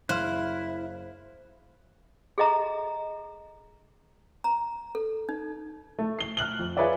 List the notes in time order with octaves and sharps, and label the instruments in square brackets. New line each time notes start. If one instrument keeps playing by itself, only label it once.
[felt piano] F#1 F6 [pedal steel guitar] E4 [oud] C5 [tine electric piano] F5 F#6
[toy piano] G#4 A4 D#5 E5 A#5
A#5
A4
D#4
[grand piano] A3
C7 G7
F6 F#6 F#7 G7
F2
F4 G#4 B4 C#5 D5 E5